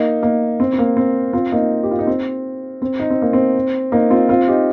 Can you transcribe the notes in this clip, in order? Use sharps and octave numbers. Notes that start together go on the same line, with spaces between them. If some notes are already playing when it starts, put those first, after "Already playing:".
Already playing: A#3 D#4
A#3 D#4
C4
C4
A#3
C4
C4 F4
A#3 D#4
G4
F4
D#4
C4
C4
D#4
C4
A#3
C4
A#3 D#4
C4 F4
C4 F4
D#4 G4